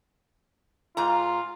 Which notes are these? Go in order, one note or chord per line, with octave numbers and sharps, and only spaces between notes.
G#2 F4 A#5